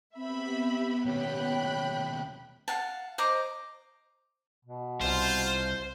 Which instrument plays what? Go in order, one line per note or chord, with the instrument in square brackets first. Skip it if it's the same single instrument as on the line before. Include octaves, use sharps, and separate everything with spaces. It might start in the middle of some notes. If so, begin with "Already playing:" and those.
[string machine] B3 G4 [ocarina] C4 [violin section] E5 B5
[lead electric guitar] D#2 B2 [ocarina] C#5 [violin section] G5 B5 F#6
[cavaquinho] F5 F#5 A5
C5 D#5 A#5 D6
[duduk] B2
[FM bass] C2 [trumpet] F4 [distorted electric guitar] C5